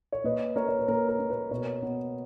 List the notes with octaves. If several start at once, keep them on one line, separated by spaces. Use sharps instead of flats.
C#5
A#3 B4 D#5
A#3 A#4 C#5
C#5
B4
A#3 A#4
A#4
A#3
B4
B2 A#4 C#5
B3